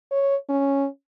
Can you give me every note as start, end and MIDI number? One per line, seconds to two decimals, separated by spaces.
0.11 0.36 73
0.49 0.87 61